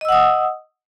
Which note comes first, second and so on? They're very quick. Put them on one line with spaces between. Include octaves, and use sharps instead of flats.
D#5 E6 F#5 D#6